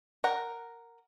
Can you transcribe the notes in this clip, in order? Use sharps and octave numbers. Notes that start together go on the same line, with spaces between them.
A#4 F#5 G5